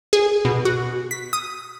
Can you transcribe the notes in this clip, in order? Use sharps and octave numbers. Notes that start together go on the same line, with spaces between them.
G#4
B2
F#4
B6
D#6